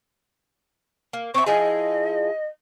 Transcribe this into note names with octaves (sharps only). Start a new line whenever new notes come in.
A#3
C4 E5 C#6
F3 E4 G#4 D#5